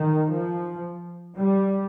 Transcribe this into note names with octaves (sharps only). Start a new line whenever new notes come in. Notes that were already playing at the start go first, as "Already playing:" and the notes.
Already playing: D#3
F3
G3